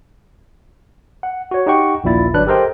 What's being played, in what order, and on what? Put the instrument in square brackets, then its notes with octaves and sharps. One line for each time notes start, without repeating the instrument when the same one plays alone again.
[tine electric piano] F#5
F#4 C#5
D#4 G4 D#5 F#5 G5 C#6
A#1 D#2 A#2 E4 A6
G1 F#3 D4 B4 F#6
G4 A4 A#4 C5 D#5 G5